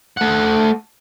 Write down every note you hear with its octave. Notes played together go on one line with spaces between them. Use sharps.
A3 F#5